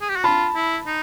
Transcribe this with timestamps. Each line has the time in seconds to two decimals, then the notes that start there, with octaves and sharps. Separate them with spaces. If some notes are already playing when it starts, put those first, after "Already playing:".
0.01 G#4
0.09 G4
0.16 F#4
0.24 F4 A5 B5
0.55 E4
0.86 D#4